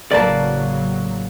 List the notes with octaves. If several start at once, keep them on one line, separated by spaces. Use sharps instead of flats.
A1 C#3 F#3 A#3 B4 D5 A5